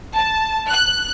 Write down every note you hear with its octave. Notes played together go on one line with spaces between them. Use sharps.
A5
F#6